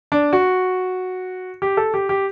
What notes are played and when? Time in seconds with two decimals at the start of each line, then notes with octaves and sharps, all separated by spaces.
0.12 D4
0.33 F#4
1.62 G4
1.77 A4
1.94 G4
2.09 G4